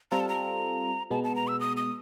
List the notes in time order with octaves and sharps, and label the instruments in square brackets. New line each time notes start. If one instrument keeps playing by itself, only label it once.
[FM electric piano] G3 C4 F4 A4 [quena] A#5
[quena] A5
A#5
[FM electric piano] B2 G#3 B3 [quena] A5
[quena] A5
A#5
E6
D#6
D#6